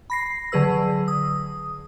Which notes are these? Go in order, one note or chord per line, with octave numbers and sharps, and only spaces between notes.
B5 A#6 C7
D3 F#3 G#4 B4 E6
D#6